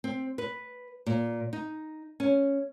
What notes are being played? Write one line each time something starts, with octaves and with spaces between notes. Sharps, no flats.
C4
B4
A#2
D#4
C#4